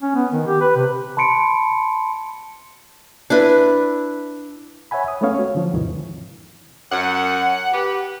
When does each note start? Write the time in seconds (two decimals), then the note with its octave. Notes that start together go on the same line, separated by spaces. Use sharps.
0.03 C#4
0.16 B3
0.32 D#3
0.47 G4
0.61 B4
0.76 C3
1.17 A5 B5 C6 C#7 D7
3.30 D4 E4 B4
4.91 C#5 E5 F#5 G#5 B5
5.08 D#6
5.21 G#3 A3 B3 C#4 C#5 F5
5.34 F#4 C#5
5.55 D3 F3
5.74 E2 G#2 C3 D#3 E3
6.91 F#2 F#5
7.72 G4 B4